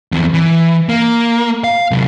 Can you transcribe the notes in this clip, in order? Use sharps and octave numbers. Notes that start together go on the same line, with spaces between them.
E2 C4
E3
A#3
F5
C3 F#3